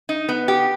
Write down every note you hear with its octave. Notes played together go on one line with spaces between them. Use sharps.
D#4
B3
G4